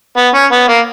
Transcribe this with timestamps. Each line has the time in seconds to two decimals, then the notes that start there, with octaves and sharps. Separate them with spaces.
0.17 B3
0.34 C#4
0.52 B3
0.68 A#3